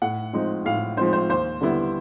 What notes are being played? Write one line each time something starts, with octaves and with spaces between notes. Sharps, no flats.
A2 F#5
F3 G#3 C4 D#4
A2 F5
F3 G#3 C4 D#4 C5
C5
D#2 C5
D3 G3 B3 E4